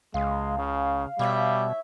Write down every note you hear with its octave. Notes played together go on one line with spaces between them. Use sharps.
C#2 G#3 F5
C#3
B2 G3 E4 C#5 E5